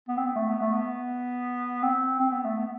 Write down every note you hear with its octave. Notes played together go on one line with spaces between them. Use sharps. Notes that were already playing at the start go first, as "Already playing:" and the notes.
B3
C4
B3
A3
B3
A3
B3
C4
C4
B3
A3
B3